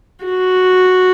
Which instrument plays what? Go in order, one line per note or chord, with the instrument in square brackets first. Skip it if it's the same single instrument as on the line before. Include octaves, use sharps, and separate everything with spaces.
[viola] F#4